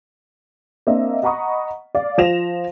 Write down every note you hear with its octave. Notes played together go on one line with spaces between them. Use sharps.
A#3 C4 D4 D#5 E5
D#5 F#5 A#5 B5 C#6 D#6
D5 F5
F3 F4 C5 A#6 E7 F7